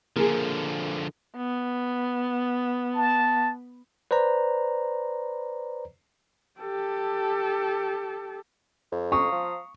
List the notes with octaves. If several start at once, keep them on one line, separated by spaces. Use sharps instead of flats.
D3 F3 A#3 G#4
B3
A5
B4 C5 D5 A#5
G4 A4
F2
F5 A#5 C#6 D#6
F3